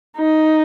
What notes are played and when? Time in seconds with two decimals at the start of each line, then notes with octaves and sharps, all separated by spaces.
0.17 D#4